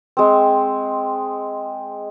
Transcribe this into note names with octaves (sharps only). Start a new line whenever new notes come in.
G#3 C4